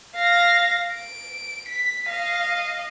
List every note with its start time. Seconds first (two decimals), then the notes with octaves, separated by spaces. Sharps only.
0.15 F5 A#6
0.95 D7
1.69 B6
2.08 D#5 F5